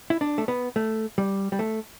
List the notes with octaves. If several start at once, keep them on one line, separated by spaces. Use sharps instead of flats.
E4
D4
A3
B3
A3
G3
G3
A3